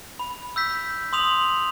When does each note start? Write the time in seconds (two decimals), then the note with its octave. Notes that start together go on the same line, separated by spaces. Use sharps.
0.19 B5
0.56 E6 G6 B6
1.13 C6 D#6 F7 F#7